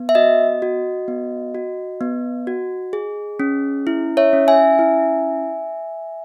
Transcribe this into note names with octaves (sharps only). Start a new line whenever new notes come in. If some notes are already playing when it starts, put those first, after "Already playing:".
Already playing: B3
E5
F#4 D#5
F#4
B3
F#4
B3
F#4
G#4
C#4
E4
C#5 E5
C#4
E5 G#5
E4